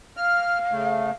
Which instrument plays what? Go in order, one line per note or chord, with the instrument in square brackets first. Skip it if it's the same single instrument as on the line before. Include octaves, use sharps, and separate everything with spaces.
[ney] F5 [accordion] F6
[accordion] C#3 A3